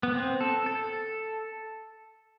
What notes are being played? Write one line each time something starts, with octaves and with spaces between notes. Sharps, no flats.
B3
C4
A4
A4